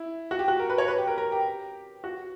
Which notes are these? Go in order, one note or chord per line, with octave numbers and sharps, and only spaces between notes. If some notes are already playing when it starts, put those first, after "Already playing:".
Already playing: E4
F#4
G4
F#4
A#4
B4
C#5
B4
G4
A#4
A#4
G4
F#4